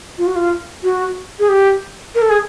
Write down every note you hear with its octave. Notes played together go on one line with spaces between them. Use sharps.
F4
F#4
F4
F#4
G#4
G4
A#4
A4
G#4